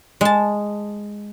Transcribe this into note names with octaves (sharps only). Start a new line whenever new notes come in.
G#3 A5